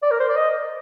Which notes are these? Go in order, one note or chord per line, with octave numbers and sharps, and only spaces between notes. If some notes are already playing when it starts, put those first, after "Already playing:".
D5
A#4
C5
D5
D#5